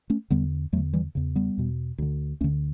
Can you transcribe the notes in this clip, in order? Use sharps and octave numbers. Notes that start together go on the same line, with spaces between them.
A3 C#4
E2 D3 G3 B3
E2 D3 F#3 A3
E3 G3
E2 C#3
G3 B3
E2 B2
D2 D3
D2 D3 A3 C#4